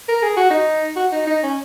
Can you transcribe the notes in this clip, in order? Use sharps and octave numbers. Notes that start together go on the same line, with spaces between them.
A#4
G#4
F#4
D#4
F#4
D#4
D#4
C#4